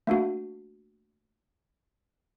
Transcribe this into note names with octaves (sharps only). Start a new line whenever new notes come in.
A3 A#3 D4 F#4